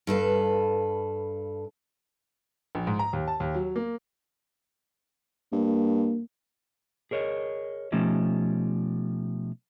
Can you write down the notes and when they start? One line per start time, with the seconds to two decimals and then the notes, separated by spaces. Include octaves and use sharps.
0.07 G2 A4 B4 F5
2.75 A#1
2.87 G#2
2.99 A#5
3.13 D#2
3.28 A5
3.40 D#2
3.54 F#3
3.76 A#3
5.53 G2 A#3
7.11 G#4 A#4 C#5 D#5
7.92 B2 F3 A3 C#4 D#4 G4